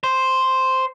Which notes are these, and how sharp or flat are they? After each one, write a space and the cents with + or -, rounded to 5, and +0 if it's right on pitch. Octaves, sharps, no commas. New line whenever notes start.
C5 +0